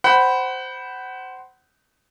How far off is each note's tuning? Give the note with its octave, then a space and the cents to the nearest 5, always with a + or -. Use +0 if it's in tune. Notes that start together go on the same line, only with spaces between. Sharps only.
C5 -5 F#5 +25 B5 +0